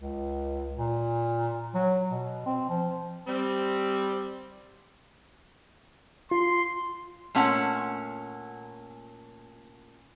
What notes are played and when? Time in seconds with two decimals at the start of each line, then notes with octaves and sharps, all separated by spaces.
0.01 C#2
0.78 A#2
1.74 F#3
2.10 B2
2.46 C4
2.69 F3
3.27 G3 C4
6.31 F4 C6
7.35 A#2 A3 C#4 F#5